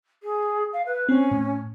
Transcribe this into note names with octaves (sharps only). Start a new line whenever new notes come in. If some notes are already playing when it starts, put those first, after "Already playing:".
G#4
F5
B4
C4 C#4
A2